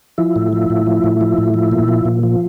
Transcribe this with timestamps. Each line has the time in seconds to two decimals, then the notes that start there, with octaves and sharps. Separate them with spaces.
0.18 F3 E4
0.36 A2
0.53 F3
0.70 A2
0.86 F3
1.04 A2
1.21 F3
1.38 A2
1.54 F3
1.71 A#2
1.88 F3
2.05 A#2
2.23 F3